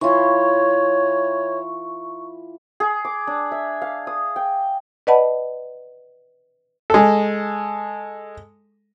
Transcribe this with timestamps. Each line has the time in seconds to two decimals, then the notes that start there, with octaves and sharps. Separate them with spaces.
0.01 E3 F4 C#5 C#6
2.80 G#4
3.05 D6
3.27 D4
3.52 E5
3.82 F5
4.07 D#6
4.36 G5
5.07 B4 D5 D#5 F#5 A5 B5
6.90 G#3 A4